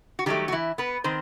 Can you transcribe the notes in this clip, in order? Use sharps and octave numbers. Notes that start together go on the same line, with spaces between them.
F#4
D#3 F#3 G3 A3 G4
F#4
E3 E4
B3 B4
D#3 C4 C5